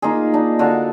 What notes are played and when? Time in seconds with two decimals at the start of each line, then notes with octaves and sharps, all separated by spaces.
0.02 A#3 D#4 F4 G#4
0.34 D4 D#4
0.59 D3 F#4 F5 A5